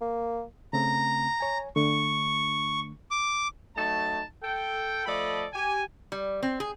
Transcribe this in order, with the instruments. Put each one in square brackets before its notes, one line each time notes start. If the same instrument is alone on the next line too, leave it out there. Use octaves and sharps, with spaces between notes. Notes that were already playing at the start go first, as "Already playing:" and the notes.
[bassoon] A#3
[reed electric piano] C#3 A3 C4 [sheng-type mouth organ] A#5
[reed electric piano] C#5 G#5
[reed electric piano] D3 A3 D4 [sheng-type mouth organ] C#6
[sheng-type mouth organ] D6
[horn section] F#3 A3 D#4 A5
A4 G5
F3 A3 A4 D5 D#5 B5
G4 G#5
[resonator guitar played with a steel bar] G3
C4
G#4